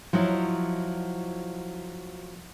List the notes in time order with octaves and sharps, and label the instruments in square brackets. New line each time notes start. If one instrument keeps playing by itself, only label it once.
[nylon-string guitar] F3 F#3 D#4 E4